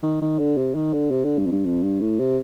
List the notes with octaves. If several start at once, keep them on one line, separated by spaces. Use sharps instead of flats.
D#3
D#3
D3
C3
D#3
D3
C3
D3
G2
F2
G2
F2
G2
A2
C3